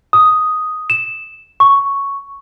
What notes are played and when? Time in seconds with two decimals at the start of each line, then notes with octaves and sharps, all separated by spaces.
0.13 D#6
0.90 E7
1.60 C#6